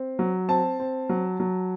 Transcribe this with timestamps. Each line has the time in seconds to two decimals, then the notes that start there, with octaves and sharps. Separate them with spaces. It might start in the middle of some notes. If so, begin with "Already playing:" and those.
Already playing: C4
0.19 F#3
0.49 C4 A5
0.80 C4
1.09 F#3
1.40 F#3